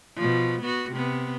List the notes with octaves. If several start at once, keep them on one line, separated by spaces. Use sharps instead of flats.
B2 F3
B3 F#4
C3 B3